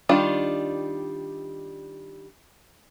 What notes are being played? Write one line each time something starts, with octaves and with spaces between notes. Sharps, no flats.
D#3 G3 D4 F4